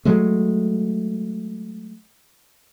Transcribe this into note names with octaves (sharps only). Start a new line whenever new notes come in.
F#3 G#3 A3